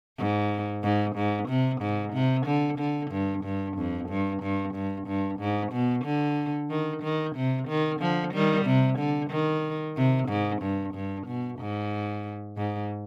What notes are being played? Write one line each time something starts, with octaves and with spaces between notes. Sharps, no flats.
G#2
G#2
G#2
C3
G#2
C3
D3
D3
G2
G2
F2
G2
G2
G2
G2
G#2
B2
D3
D#3
D#3
C3
D#3
D3 F3
D#3 G3
C3
D3
D#3
C3
G#2
G2
G2
B2
G#2
G#2